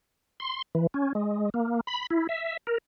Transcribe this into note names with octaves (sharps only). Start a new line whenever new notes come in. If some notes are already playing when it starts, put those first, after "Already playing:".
C6
E3
C#4
G#3
A#3
B5
E4
E5
A#4